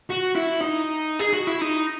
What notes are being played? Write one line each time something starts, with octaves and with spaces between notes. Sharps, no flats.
F#4
E4
D#4
G#4
F#4
E4
D#4